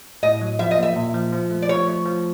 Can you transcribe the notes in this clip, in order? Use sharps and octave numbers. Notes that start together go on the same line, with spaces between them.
A2 D#5
F#3
F3 E5
D#5
A#3 E5
A#2
F3
F3
A3
D5
F3 C#5
A3
F3